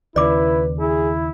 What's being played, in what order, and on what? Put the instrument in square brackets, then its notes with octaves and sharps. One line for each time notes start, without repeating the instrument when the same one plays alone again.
[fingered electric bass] D#2 C#3 [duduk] E4 [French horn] B4 [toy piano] D5 D6
[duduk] E4 [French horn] G#4